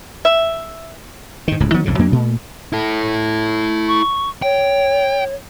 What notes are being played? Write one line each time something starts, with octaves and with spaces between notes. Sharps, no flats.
E5
G#2 D#3
D1 C#2 A2
D#3 F3 F#3 B3
B1 F2 G#2 C#3
F2 F#3 A#3 D4
A#2 A3
E4 A4
C#6
C#5 G5